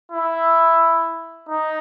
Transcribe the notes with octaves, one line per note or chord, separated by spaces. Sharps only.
E4
D#4